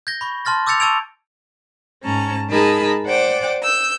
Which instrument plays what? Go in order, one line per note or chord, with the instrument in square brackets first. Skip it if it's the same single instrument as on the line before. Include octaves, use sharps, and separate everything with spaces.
[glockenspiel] G6 G#6 A#6 G7
B5 C#6
A5 C6 F6 A6 A#6
D6 E6 G6 A6 C#7 F7
A5 C#6 E6 G#6 D7 F7
[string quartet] G#2 C#4 A5 A#5
G#3 D#4 G#4 A#4 A5 B5
C5 D5 F#5 G5 D6
E6 G6